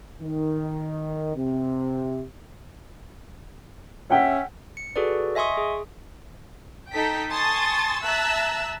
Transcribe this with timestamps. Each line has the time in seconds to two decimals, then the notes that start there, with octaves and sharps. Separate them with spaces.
0.21 D#3
1.36 C3
4.10 C#4 E5 F#5 G5
4.77 C#7
4.96 F#4 G#4 A4 B4 D5
5.35 D#5 E5 G#5 C6 C#6 D#6
5.57 G#4
6.93 D#4 A4 G5 B6
7.31 G#5 A5 C6 C#6 D#6 A6
8.03 E5 A5 A#5 E6 F#6